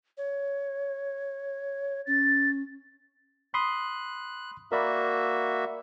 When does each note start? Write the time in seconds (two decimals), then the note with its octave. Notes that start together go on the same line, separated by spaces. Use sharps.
0.17 C#5
2.07 C#4 A6
3.54 B5 C6 D#6 F#6
4.72 A#3 F#4 A#4 D5 E5 B5